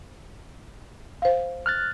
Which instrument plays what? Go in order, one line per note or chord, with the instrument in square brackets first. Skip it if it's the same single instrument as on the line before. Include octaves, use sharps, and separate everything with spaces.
[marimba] C5 F5
[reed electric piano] F6 F#6 A6